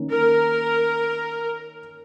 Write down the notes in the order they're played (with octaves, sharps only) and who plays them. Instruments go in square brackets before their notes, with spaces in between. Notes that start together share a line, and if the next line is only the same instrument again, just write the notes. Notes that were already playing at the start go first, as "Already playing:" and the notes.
Already playing: [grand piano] D#3 A#3 C#4
[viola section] A#4